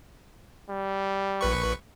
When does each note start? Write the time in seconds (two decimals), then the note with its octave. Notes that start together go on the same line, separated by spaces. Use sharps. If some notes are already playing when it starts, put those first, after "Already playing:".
0.69 G3
1.41 A#1 B4 C#6